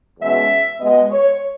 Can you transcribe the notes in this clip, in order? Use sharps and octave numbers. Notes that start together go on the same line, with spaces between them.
E2 B2 G#3 C#4 E5
B2 G#3 B3 D#5
C#5